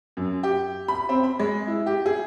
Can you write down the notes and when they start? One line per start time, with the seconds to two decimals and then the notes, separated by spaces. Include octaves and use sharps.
0.17 F#2
0.43 G4
0.88 B5
1.09 C4
1.24 B5
1.39 G#3
1.68 E4
1.86 G4
2.06 G#4